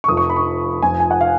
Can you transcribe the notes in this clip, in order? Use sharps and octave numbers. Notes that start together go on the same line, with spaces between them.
C#6
F1 F2 F3 D#6
C#6
B5
C#6
F1 F2 F3 G#5
G#5
F#5
F5